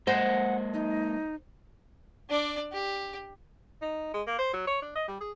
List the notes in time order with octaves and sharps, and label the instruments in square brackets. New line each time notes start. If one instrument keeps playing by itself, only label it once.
[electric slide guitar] G#3 A#3 D#5 [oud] C5 [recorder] F#5
[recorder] D#4
[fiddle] D4 D5
G4
[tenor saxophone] D#4
G#3
A#3
C5
F#3
C#5
D4
D#5
G3
G#4